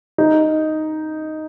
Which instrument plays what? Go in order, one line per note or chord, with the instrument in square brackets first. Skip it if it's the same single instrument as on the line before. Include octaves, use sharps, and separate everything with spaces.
[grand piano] D#4